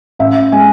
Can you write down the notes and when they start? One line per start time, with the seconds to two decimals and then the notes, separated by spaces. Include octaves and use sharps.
0.19 A1 E5
0.52 G#3 G#5